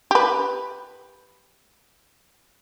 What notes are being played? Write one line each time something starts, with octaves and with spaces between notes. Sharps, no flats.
G4 B4